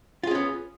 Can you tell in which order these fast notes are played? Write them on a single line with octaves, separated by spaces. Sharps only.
F4 G#4 C#4 B3